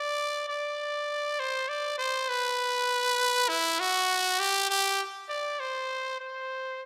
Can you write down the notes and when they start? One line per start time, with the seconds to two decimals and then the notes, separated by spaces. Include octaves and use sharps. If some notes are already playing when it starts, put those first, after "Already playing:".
Already playing: D5
0.49 D5
1.40 C5
1.69 D5
1.99 C5
2.29 B4
3.49 E4
3.80 F#4
4.40 G4
4.70 G4
5.29 D5
5.60 C5
6.20 C5